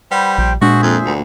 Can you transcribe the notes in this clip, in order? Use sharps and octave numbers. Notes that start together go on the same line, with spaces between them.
G3 B4 C5 F#5
A#1 C5 G5
A#2 G#3 D4 F#4 G#4 C5 E5
F2
D2